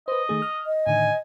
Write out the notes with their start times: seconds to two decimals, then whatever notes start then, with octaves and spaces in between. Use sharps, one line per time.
0.08 B4 C5 D#5
0.29 D#3 A3 G#4
0.42 F6
0.66 D#5
0.87 A2 D3 D#3 G#5